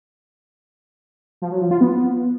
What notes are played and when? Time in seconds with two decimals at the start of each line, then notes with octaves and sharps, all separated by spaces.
1.42 F3
1.51 F#3
1.61 F3
1.71 F4
1.81 B3